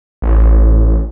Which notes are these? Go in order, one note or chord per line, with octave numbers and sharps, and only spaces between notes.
A1